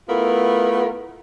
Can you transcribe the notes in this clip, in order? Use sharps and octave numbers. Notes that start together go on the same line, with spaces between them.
A3 B3 E4 F4 A#4